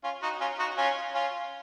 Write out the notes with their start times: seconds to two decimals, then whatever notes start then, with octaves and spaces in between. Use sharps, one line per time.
0.04 C#4 F4
0.22 D#4 F#4
0.40 C#4 F4
0.59 D#4 F#4
0.77 C#4 F4
1.14 C#4 F4